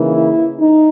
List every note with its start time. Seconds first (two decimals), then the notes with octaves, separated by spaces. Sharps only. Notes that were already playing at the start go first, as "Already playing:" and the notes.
Already playing: C#3 E3 A#3 D#4
0.13 E4
0.60 D#4